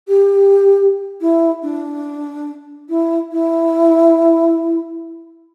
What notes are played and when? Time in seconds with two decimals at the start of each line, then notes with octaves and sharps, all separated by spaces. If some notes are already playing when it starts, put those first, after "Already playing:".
0.08 G4
1.21 E4
1.63 D4
2.89 E4
3.32 E4